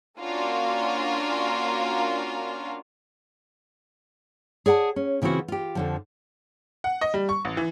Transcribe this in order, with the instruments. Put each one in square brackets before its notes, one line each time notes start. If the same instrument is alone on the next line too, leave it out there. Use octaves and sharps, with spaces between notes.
[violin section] A#3 C#4 D4 F4 F#4 A#4
[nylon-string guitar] G#4 D5 F#5 G#5 A5
C#4
C#3 E3 C4 F4 F#4
F4 G4
F2 D3 F3
[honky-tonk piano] F#5
D#5
G3
C#6
A1
E3